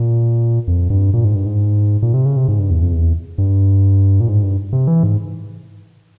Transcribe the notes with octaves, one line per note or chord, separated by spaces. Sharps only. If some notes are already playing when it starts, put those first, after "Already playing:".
Already playing: A#2
F2
G2
A#2
G#2
G2
G#2
A#2
C3
C#3
C3
G#2
G2
E2
F2
E2
G2
A#2
G#2
G2
C3
E3
G#2